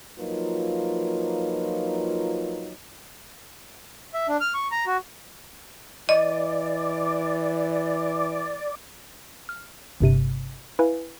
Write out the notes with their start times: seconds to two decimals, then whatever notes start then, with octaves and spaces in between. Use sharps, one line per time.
0.19 F3 F#3 A#3 D#4 F4 B4
4.14 E5
4.28 D4
4.41 F6
4.54 C#6
4.71 A#5
4.86 F#4
6.09 E3 D5 D#5
9.49 F6
10.00 G1 G2 C3 D#7
10.79 E4 B4 F5 G#5